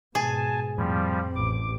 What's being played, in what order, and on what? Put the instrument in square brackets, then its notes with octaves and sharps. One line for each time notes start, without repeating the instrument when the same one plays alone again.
[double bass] G#2 B2 [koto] G#4 [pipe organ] G#5 A5
[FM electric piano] F2 A2 B5 [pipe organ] F3 G3 [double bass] C4
[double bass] A1 [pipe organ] D6